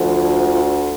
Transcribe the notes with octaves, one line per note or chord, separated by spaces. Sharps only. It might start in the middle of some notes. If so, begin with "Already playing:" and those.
Already playing: D2 D3 F3
F4